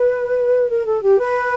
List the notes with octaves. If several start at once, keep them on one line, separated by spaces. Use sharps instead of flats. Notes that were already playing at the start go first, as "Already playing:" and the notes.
Already playing: B4
A#4
A4
G4
B4